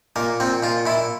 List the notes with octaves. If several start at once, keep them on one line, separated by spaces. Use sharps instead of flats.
A#2 A#3
A#2 C4
A#2 F4
A#2 E4